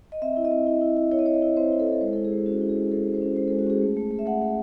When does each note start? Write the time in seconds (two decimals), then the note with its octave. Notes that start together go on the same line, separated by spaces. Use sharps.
0.12 D#5
0.22 C4 E5
0.37 E4
0.45 D#5
0.51 C4
0.67 E4
0.81 E4
0.97 E4
1.11 E4 C#5
1.19 D#5
1.26 E4 C#5
1.34 D#5
1.42 E4
1.57 C4 C5
1.72 E4
1.80 A4
1.87 E4
1.93 A4
2.01 G#3 C5
2.13 E4 A4
2.25 G#4
2.31 G#3
2.46 C#4 F#4
2.62 E4
2.69 G#4
2.76 G#3
2.91 G#3 A4
3.06 G#3
3.14 C5
3.21 C#4
3.36 G#3 C5
3.48 A4
3.51 G#3
3.59 F#4
3.67 C#4 G#4
3.82 A3
3.97 A3
4.11 A3
4.19 E5
4.26 A3 F#5
4.42 A3